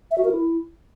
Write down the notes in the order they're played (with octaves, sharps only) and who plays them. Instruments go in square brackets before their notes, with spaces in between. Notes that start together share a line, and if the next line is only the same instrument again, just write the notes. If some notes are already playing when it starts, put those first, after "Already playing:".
[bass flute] E5
F#4
A#4
E4